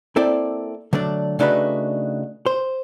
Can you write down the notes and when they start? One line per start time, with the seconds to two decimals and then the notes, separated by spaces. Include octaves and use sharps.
0.16 A#3 C4 E4 A4 D5 G5
0.93 D3 F#3 A3 D4 D5
1.39 C#3 A3 D4 D#4 F#4 B4
2.46 C5